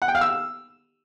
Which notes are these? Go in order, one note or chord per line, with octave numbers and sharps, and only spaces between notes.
F#5
G5
F5
E6